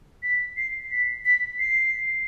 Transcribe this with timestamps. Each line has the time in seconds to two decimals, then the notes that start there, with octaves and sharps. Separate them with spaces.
0.23 B6
0.57 C7
0.91 B6
1.25 B6
1.59 C7